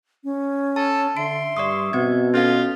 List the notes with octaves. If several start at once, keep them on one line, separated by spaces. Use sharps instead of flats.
C#4
A4 A5
D3 E5 C6 D7
G2 D5 C#6 D#6
B2 C4 G#6
C#4 F4 A4 F5